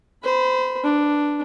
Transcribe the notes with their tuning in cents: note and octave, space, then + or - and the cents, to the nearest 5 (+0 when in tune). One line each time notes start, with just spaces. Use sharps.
C5 -25 B5 +0
D4 +0 B4 +0